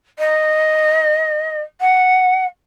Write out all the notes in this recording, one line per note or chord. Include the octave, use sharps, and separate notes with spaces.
D#5
F#5